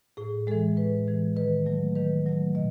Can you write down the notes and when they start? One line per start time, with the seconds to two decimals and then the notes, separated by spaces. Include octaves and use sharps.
0.17 A2 G#4
0.47 E3 G#3 A4
0.77 A2 B4
1.07 E3 G#3
1.36 D#3 B4
1.66 F#3 A3
1.95 D#3 B4
2.26 F#3 A3
2.55 B2 D#5